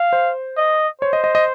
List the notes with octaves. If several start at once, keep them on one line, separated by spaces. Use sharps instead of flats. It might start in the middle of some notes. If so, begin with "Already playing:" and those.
Already playing: F5
C5
D#5
C5 C#5
D#5
D#5
D#5